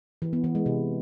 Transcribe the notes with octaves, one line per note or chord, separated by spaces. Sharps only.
E3
B3
E3
G#3
C3